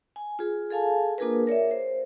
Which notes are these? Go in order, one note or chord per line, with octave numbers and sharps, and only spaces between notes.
G#5
F4 G#4
G#4 A4 F5 G#5 A5
A#3 D4 F4 G#4 A#4 B4
A#4 C#5 D5 E5
C5